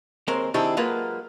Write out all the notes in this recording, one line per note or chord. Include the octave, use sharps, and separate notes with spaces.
D#2 G#3 C4 A#4 C5
D#3 C4 D4 E4 G4 G#4
F#3 G#3 A#3 F4 B4